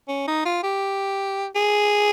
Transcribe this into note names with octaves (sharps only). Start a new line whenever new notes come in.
C#4
D#4
F4
G4
G#4